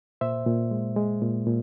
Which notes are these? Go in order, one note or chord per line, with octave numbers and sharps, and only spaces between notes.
A#2 C5 E5
A#2
G#3
G#3
A#2
A#2